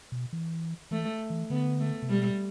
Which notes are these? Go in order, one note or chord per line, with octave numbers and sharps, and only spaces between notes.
B2
E3
E3 A3
E3
D3 B3
A3
C3
B2 G3